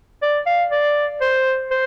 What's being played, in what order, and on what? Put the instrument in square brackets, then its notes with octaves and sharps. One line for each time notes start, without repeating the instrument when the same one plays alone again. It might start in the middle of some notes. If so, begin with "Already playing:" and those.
[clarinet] D5
F5
D5
C5
C5